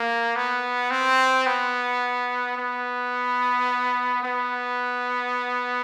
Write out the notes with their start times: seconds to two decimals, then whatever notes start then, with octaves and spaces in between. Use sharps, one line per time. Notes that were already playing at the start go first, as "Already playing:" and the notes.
Already playing: A#3
0.36 B3
0.91 C4
1.46 B3
2.57 B3
4.23 B3